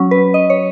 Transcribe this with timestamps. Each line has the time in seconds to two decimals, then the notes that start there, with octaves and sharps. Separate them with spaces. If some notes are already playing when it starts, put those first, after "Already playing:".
Already playing: F#3 C#4
0.11 B4
0.34 D#5
0.50 C#5